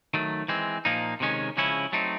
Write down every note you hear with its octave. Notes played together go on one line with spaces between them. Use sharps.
D#3 F#3 A3
E3 G#3 C4
A#2 F3 A#3 D#4
C3 D#3 G#3 C#4
C#3 F3 G#3 C#4 E4
F#3 A3 C4 D#4